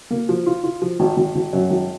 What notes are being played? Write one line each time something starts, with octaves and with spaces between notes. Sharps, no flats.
A#3
F3
F4
F4
F3
G#1
G#1
G#1
F#2
G#1